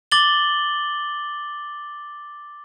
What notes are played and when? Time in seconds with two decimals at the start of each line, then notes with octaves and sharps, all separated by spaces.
0.12 D6 A6 F#7 G7